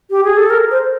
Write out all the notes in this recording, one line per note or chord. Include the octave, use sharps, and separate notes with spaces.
G4
G#4
A4
A#4
C5